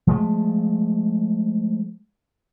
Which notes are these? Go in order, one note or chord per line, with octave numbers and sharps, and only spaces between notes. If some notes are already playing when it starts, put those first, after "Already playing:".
F3 G#3 A3